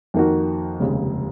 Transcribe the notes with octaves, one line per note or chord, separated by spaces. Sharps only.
F2 D#3 A#3 D#4 F#4
F1 D#2 C#3 G#3